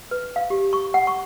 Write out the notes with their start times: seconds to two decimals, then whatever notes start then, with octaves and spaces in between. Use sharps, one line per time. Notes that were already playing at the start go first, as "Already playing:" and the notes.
0.11 B4
0.36 F5
0.50 G4
0.73 C#6
0.94 F#5
1.07 C#6